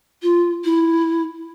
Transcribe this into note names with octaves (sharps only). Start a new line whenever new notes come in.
F4
E4